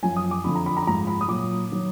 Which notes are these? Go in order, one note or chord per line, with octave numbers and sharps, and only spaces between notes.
F#2 F3 G#5
D#6
D6
F2 D3 F3 B5
A#5
B5
A#5
B5
G#2 F3 A#5
B5
D#6
A#2 F#3 D6
D#3 F#3